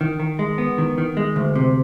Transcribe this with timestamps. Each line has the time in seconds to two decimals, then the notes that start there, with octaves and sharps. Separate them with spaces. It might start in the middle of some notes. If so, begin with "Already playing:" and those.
0.01 D#3
0.20 D#3
0.39 G#3
0.58 B3
0.78 D#3
0.98 D#3
1.17 G#3
1.36 D2
1.56 C3